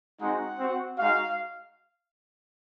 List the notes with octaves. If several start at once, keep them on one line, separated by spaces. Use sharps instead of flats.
G#3 C4 D#4 F#4 F#5
C4 F#4
G#3 D#4 F#4 F5